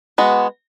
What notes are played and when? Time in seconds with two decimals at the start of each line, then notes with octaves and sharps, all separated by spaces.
0.18 G#3 B3 F#4